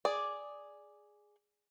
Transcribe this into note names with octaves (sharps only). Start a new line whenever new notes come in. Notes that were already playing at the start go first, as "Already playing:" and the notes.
G#4 D5